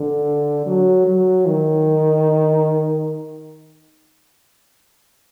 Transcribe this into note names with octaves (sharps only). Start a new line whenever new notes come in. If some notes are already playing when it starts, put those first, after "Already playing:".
Already playing: D3
F#3
F#3
D#3